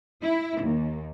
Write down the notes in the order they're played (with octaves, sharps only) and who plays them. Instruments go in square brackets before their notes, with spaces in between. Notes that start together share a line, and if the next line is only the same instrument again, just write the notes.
[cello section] E4
D#2